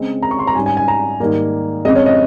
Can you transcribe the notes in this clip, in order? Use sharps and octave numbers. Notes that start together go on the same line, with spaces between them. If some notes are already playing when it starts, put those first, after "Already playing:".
Already playing: C#3 G#3 C4
A#5
C#6
C6
A#5
G#2 G3 C#4 G#5
G#5
G#5
A#5
G#2 D#3 G3 A#3
F2 C#3 G#3 C4 D#5
C#5
D#5